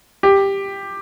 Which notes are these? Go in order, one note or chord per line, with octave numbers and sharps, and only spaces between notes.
G4